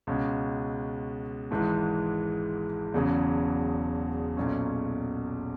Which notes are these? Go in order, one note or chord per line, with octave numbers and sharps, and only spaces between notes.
C#2 B2 G#3 C#4
G#1 G#2 E3 G#3
E1 E2 C#3 F#3
B1 A#2 F#3 C#4